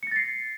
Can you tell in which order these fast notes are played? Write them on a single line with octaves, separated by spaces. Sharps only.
C#7 A#6 A6 C7